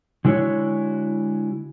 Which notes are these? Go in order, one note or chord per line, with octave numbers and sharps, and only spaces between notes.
D3 G#3 E4 F#4 C#5